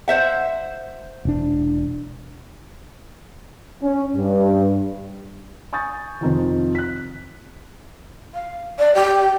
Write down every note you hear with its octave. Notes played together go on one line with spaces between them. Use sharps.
C5 E5 F#5
E1 D4
C#4
G2
G#5 C#6 D#6 G6 A6
F2 C3 D#3 F3
F#6 B6
F5
D5
G4